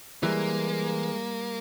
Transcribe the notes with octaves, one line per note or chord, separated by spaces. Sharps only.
E3 G3 G#3 A#3